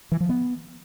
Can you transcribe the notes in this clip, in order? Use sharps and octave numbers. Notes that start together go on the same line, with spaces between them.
E3
F3
B3